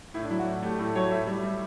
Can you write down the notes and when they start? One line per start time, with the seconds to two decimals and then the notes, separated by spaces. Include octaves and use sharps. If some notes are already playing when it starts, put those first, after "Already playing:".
0.14 A2 E4
0.23 D4
0.30 F#3 E4
0.39 F#4
0.47 A2
0.62 A3 G4
0.78 A2 A4
0.96 F#3 C#5
1.11 A2 E5
1.27 G3
1.43 G3